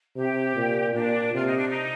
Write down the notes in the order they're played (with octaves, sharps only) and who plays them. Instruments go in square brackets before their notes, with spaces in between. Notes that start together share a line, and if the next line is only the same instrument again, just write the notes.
[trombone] C3 [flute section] G4
[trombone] A#2
[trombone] A#2 [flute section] D4
[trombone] C3 [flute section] F4
[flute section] D#4
D4
D#4